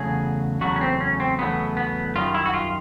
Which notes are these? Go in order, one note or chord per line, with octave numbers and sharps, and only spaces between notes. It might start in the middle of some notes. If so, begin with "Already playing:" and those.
Already playing: E2 C#3 F#3 A3 G#4
E2 C#3 F#3 A3 F#4
C#4
C4
C#4
C4
E2 C#3 F#3 A3 B3
B3
F#2 D#3 G3 F4
E4
F#4
F4